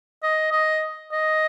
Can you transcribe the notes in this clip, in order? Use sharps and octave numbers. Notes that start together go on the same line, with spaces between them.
D#5
D#5
D#5